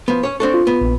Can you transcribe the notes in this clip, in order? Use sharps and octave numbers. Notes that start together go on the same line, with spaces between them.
F3 B3
C#4 C#5
C4 D4 A4 C#6
F4
B3
A#1